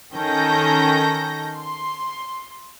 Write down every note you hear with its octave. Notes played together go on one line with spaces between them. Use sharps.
D#3 C#4 A4 G6 A#6
C6